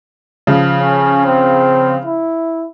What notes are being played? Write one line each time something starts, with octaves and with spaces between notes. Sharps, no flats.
C#3 F3
C#4
C4
E4